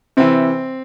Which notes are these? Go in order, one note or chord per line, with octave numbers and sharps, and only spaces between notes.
C3 E3 C4